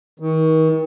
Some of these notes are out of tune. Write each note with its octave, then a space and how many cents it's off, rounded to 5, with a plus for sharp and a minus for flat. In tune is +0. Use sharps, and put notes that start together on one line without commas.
D#3 +35